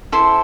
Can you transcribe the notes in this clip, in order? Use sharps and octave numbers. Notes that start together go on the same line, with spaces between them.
E4 A4 C5 C6